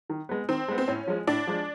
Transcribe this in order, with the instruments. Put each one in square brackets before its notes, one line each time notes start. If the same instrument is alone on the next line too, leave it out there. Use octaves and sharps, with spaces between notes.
[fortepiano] D#3
G#3 B3
[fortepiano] D#3 [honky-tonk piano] C4
[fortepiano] G#3 B3
[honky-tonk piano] C4
[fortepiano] A2 [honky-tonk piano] C#4
[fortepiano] F3 G#3
[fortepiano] A2 [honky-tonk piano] D4
[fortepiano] F3 G#3